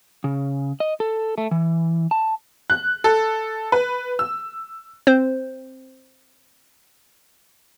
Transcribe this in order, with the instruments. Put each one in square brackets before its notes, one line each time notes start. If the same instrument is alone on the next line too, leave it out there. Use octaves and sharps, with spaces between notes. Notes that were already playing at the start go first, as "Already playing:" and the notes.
[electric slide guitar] C#3
D#5
A4
A3
E3
A5
[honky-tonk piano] F#6
A4
B4
E6
[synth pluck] C4 C5